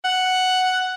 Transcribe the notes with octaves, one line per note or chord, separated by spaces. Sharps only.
F#5